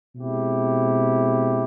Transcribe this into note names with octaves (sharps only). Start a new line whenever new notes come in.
B2 G#3 C4 E4 G4